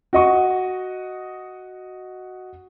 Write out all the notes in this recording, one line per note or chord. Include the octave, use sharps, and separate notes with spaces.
F#4 D#5 C#6